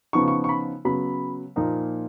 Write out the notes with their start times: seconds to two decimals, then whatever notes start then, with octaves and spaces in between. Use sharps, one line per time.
0.13 C#3 F3 B3 D#4 C#6
0.28 C#6
0.44 C#6
0.49 B5
0.85 C#3 F#3 B3 B5
1.56 A#2 F3 A#3 D#4